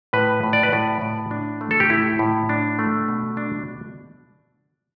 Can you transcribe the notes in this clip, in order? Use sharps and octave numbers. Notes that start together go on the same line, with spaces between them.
A2 B4
A2
D5
B4
A2 D5
A2
D4
A3
A4
G4
A2 E4
A2
D4
A3
B2
D4